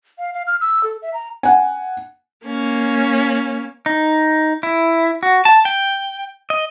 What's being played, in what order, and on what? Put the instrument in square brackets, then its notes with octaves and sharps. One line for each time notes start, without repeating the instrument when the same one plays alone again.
[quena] F5
F5
F6
E6
A4
E5
A#5
[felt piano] F#5 G#5
[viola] A#3 C#4
[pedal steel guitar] D#4
E4
F#4
A5
G5
D#5